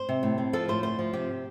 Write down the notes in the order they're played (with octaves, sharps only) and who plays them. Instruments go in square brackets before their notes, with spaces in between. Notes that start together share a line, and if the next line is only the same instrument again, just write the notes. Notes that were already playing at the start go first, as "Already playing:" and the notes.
Already playing: [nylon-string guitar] C5
C3
A2
C4
F3 A4
A2 C5
D2 C5
F3
C3 G4